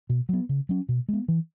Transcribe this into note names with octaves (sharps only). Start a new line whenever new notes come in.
B2
F#3 B3
C#3
F#3 C#4
B2
G#3 B3
E3